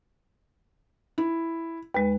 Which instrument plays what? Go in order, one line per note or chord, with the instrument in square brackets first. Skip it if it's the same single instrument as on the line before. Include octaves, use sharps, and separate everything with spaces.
[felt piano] E4
[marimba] D#2 G#3 [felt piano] B4